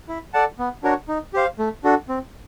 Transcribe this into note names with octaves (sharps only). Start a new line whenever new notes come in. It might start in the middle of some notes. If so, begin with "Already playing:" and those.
E4
A4 D5 F#5 A5
B3
D4 F#4 A#4 C#5
D#4
G4 C5 F5
A3
D4 F#4 A4
C4